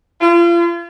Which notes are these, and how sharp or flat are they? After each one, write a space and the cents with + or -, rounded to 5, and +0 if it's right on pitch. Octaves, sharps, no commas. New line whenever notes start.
F4 -35